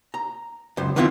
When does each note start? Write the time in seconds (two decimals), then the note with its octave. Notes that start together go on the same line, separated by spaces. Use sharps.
0.14 A#5
0.77 C#2 F#2 C5
0.96 D#3 B3 C4 D4 E4 F4